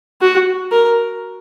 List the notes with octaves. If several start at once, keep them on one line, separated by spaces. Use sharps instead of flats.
F#4
A#4